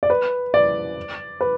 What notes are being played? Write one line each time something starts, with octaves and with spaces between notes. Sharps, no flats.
D5
B4
D5
B4